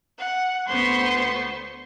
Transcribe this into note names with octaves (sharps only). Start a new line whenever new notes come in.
F#5
D2 B3 C5 C6 C#6